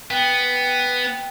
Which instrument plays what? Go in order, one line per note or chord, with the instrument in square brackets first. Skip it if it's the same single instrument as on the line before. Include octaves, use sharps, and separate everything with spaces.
[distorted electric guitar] B3 [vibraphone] G5